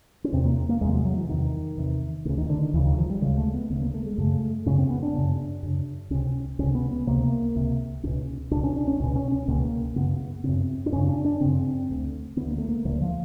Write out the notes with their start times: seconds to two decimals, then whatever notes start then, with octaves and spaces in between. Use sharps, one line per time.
0.24 C#4
0.32 E2 C3 C4
0.45 A#3
0.69 A#3
0.81 E2 G#3
0.85 C3
0.93 F#3
1.05 F#3
1.17 E3
1.29 E2 C3 D#3
1.77 E2 C3
2.25 D2 D3
2.29 C#3
2.38 D#3
2.49 D3
2.61 D#3
2.73 D2 C#3 E3
2.86 D#3
2.98 F3
3.10 G3
3.22 D2 C#3 G#3
3.38 A3
3.54 B3
3.70 D2 C#3 B3
3.82 A#3
3.94 A3
4.06 G#3
4.18 F#2 C#3 A3
4.66 F#2 C#3 C#4
4.78 C4
4.90 B3
5.03 D4
5.14 F#2 C#3
5.63 F#2 C#3
6.10 C#2 C3 C#4
6.59 C#2 C3 C#4
6.75 B3
6.91 B3
7.07 C#2 C3 A#3
7.56 C#2 C3
8.03 C#2 B2 C#4
8.51 C#2 B2 D4
8.63 C#4
8.76 D4
8.88 C#4
9.00 C#2 B2 C#4
9.16 C#4
9.32 C#4
9.48 C#2 B2 A#3
9.96 F#2 C#3 B3
10.20 B3
10.44 F#2 C#3 C4
10.86 D4
10.92 F#2 C#3 C#4
11.09 D4
11.25 D4
11.40 F#2 C#3 C4
11.89 D2 D3
12.36 D2 D3 B3
12.47 A#3
12.58 A3
12.69 A#3
12.85 D2 E3
12.88 D3
13.01 F3